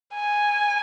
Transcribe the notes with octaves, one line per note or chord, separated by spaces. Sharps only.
G#5